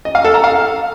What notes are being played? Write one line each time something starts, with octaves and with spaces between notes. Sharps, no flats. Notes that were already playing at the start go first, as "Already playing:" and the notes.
D#5
F5
A4
A#5
F5